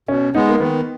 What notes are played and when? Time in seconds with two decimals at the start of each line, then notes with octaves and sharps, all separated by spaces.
0.08 B2 C#4
0.34 G#3 B3 D#4
0.49 A#3
0.60 D#3 B3